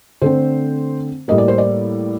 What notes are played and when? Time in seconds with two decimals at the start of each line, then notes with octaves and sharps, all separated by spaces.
0.22 D3 A3 C4 C5
1.28 A2 G3 A#3 D#5
1.38 D5
1.48 C5
1.58 D5